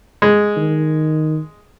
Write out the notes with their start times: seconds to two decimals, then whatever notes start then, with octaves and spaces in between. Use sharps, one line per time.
0.22 G#3
0.57 D#3